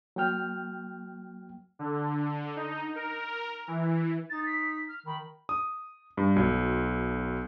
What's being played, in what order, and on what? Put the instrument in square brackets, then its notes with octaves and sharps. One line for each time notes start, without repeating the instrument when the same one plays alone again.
[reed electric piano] F#3 A#3 G5 F6
[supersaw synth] D3
D#4
A#4
E3
[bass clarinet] D#4 [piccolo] A6
[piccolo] B6
F6
[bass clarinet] D#3 [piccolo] B5
[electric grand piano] D#6
G2
B1 F#3